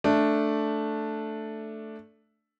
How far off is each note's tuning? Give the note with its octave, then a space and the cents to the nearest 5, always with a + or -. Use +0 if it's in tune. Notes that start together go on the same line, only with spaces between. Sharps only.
A3 +0 D4 +0